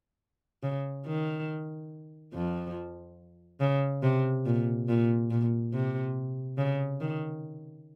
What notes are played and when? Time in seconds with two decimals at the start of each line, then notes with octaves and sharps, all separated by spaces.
0.63 C#3
1.06 D#3
2.33 F2 F3
3.60 C#3
4.03 C3
4.46 A#2
4.89 A#2
5.31 A#2
5.74 C3
6.58 C#3
7.01 D#3